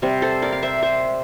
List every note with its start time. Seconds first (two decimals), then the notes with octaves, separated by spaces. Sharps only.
0.02 C3 G3 C4
0.22 A4 C5
0.42 A#4 D5
0.53 F5
0.63 C5 E5
0.82 C5 E5